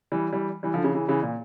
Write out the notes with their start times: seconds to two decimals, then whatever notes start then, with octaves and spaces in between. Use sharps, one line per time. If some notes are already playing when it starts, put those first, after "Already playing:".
0.12 E3 G3
0.32 E3 G3
0.63 E3 G3
0.74 D3 F3
0.84 C#3 E3
0.95 C#3 E3
1.08 C#3 E3
1.23 A#2